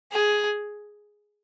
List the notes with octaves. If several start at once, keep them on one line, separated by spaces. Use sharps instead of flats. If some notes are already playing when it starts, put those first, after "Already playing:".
G#4